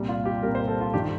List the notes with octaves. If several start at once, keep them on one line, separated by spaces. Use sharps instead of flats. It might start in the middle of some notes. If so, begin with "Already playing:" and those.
Already playing: C2 A#2 G3
F4
G4
C2 A#2 G3 A#4
C5
A4
F4
G2 D#3 G3 G4